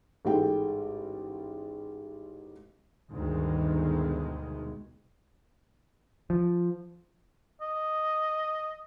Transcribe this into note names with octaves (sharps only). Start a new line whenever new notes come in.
A1 G#2 G#3 A4 G5
D2 G2 B2 D#3 G#3
F3
D#5